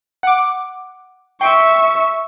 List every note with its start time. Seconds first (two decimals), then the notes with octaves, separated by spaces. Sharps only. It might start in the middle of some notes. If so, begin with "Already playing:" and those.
0.23 F#5 D6
1.41 E5 G5 C6 C#6